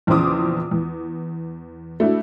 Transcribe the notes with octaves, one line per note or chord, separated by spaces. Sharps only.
A#1 E2 C#3 C5 D6 D#6
E2
A3 D4 E4 F#4